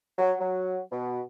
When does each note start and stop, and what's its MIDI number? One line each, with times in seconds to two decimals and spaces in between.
0.19 0.33 54
0.40 0.78 54
0.91 1.21 47